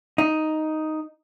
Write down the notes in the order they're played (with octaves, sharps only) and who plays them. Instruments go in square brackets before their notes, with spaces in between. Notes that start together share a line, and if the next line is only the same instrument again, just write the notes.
[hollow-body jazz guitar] D#4